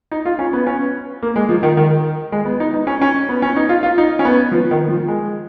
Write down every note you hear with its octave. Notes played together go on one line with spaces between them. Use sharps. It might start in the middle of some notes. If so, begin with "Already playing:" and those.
D#4
F4
C#4
B3
C#4
A#3
G#3
F3
D#3
D#3
G#3
B3
D#4
D#4
C#4
C#4
B3
C#4
D#4
F4
F4
D#4
C#4
B3
F3
D#3
F3
G#3